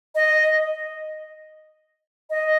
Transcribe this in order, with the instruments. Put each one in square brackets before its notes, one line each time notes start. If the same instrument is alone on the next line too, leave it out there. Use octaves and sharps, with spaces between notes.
[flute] D#5
D#5